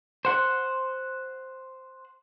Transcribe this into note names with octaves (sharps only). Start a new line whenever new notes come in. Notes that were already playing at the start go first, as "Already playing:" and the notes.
C5 F#5